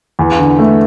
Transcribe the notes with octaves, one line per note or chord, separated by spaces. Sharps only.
E2
D3
A3